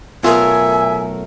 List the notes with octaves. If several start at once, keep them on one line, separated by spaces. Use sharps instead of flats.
B1 A3 F4 A#4 E5 G#5